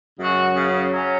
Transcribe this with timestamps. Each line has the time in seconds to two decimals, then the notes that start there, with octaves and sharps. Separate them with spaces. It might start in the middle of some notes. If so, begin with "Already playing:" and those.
0.19 F#2 C#3 G#3 F#4
0.55 C#3
0.92 F#3 C#4